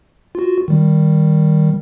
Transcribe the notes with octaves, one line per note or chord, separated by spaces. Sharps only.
F4 F#4
D#3 G3